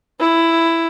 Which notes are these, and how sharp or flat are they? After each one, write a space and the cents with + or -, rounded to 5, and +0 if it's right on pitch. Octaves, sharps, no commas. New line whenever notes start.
E4 +10